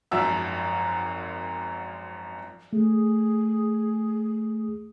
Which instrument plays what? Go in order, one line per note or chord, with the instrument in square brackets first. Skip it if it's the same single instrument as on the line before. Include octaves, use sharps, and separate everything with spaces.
[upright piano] G#1 F#2 F3 E5 F#5 E6
[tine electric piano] A3 [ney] G#4